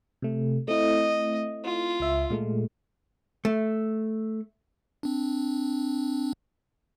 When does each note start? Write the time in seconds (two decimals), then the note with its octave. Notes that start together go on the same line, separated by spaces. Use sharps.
0.22 C3 A3
0.68 A3 C4 E4 D#5
1.65 F4
2.00 C#2 E5
2.30 A#2 G#3 A3
3.45 A3
5.03 C4 D4